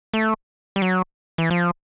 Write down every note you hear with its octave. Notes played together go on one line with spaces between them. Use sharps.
A3
G3
F#3
E3
F3